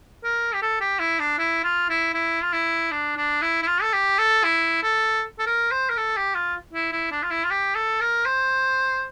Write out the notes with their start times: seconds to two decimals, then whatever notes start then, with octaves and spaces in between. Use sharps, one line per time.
0.24 A#4
0.54 G4
0.62 A4
0.80 G4
0.99 E4
1.19 D4
1.38 E4
1.64 F4
1.90 E4
2.14 E4
2.42 F4
2.52 E4
2.91 D4
3.17 D4
3.42 E4
3.62 E4
3.67 F4
3.82 A4
3.93 G4
4.19 A4
4.44 E4
4.83 A4
5.39 A4
5.46 A#4
5.71 C5
5.90 A#4
5.97 A4
6.17 G4
6.35 F4
6.73 E4
6.92 E4
7.11 D4
7.23 F4
7.30 E4
7.44 F4
7.50 G4
7.75 A4
8.01 A#4
8.26 C5